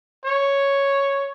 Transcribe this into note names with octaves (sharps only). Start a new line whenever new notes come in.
C#5